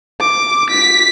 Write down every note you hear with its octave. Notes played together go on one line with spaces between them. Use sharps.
D6
B6